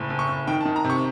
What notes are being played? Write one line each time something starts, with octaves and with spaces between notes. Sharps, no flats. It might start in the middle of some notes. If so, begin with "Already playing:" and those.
Already playing: F#1 A2
F#1
C#6
F#1
D#3 G5
A5
D#3
A#5
C3
C#6